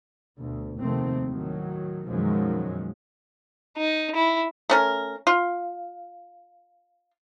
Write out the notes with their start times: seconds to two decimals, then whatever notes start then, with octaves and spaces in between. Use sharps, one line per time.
0.37 D2 B2
0.80 F1 D#2 C3 D#3 A3 C4
1.28 A2 D#3 F#3
2.07 F#2 B2 D#3 F3 F#3 G#3
3.78 D#4
4.16 E4
4.70 A3 C#4 A#4
5.27 F4